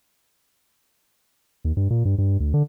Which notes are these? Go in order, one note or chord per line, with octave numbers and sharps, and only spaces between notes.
D#2
G2
A#2
G2
G2
D2
D3